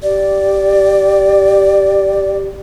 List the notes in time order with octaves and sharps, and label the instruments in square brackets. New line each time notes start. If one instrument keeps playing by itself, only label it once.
[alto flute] G4 [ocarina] D5